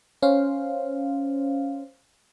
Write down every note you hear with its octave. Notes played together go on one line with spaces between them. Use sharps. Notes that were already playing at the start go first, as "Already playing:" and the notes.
C#4 C5 F5